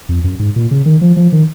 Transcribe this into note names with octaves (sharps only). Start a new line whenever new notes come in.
F2
F#2
G#2
A#2
C#3
D#3
F3
F3
D#3